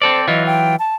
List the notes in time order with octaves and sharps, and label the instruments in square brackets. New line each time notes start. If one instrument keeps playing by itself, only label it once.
[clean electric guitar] C4 A4 D5 [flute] C5
[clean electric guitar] E3 F#3 F4 [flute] D#5
[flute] G5
A5